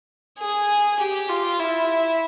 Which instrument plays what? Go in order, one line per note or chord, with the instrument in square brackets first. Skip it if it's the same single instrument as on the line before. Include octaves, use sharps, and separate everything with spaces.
[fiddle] G#4
G4
F4
E4